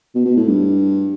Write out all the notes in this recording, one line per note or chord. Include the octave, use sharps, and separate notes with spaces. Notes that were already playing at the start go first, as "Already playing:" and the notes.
B2
B2
A2
G2